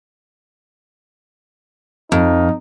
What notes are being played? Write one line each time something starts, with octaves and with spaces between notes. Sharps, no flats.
F2 D#4